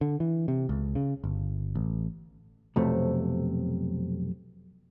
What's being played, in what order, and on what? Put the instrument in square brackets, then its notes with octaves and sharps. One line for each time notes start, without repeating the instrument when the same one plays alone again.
[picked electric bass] D3
E3
C3
C#2
C#3
G1
A1
[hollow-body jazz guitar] B1 F2 C3 A3